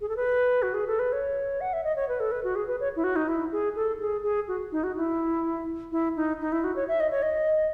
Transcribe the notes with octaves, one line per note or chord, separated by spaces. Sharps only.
G#4
A4
B4
F#4
G#4
A4
B4
C#5
F#5
E5
D#5
C#5
B4
A4
B4
F#4
G#4
B4
C#5
E4
F#4
D#4
E4
G#4
A4
G#4
G#4
F#4
D#4
F#4
E4
E4
D#4
D#4
E4
F#4
C#5
E5
D#5
C#5
D#5